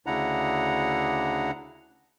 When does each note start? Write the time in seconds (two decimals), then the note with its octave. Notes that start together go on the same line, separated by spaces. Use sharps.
0.06 D2 C#3 D4 E4 F#5 A#5